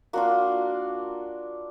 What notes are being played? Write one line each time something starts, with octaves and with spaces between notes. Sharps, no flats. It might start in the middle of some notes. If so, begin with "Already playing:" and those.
A#3 D4 F4 F#4